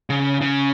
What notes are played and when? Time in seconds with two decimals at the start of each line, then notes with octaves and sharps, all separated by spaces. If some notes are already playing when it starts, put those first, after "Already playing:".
0.10 C#3
0.41 C#3